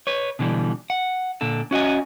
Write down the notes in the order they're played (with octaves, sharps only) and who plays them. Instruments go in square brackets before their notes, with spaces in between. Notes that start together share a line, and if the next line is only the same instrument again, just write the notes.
[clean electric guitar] B4 C#5
B2 D3 E3 G3
F#5
A#2 D3 A4
C#4 F#4 D#5 G#5